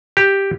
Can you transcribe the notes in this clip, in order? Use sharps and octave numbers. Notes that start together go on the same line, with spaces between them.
G4